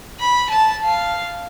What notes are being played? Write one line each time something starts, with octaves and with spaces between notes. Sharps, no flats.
B5
A5
F5